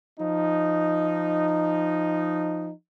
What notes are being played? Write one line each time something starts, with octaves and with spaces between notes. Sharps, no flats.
F3 D#4